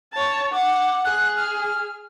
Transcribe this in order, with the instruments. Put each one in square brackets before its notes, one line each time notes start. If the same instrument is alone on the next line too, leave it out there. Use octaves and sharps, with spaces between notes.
[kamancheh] C#5 A5
[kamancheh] F#5 [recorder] D6
[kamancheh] G#4 [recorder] F#6
[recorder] F6